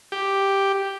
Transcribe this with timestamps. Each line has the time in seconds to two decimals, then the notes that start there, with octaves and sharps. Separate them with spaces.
0.12 G4